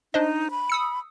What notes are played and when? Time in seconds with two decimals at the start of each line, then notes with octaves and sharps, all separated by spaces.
0.14 D4 D#4 C5 D#5
0.51 B5
0.70 D#6 E6 C#7